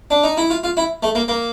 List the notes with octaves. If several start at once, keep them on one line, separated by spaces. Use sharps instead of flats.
D4
D#4
E4
F4
F4
E4
A3
A#3
A#3